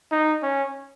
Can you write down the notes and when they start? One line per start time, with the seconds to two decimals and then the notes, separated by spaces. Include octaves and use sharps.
0.12 D#4
0.43 C#4